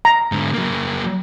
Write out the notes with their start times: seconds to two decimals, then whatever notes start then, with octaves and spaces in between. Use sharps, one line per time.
0.05 A#5
0.32 G#2 D3
0.54 F#3 A#3